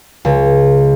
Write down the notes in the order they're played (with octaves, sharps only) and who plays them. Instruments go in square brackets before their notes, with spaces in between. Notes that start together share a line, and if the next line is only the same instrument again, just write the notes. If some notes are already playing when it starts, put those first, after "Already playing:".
[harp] C#2